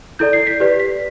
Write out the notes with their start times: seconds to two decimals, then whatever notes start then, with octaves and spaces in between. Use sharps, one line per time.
0.19 E4 A4 D5 G6
0.33 C7
0.47 B6
0.60 G4 B4 D5
0.80 B6